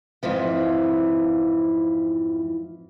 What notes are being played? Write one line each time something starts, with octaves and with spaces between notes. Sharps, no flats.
F2 G#2 E3 F3